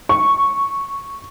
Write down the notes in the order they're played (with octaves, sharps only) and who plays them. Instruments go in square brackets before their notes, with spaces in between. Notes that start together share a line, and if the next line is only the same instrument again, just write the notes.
[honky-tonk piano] C#6